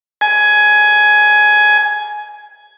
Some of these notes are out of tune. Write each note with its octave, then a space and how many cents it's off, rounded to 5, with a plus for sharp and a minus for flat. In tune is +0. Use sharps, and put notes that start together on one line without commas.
G#5 +15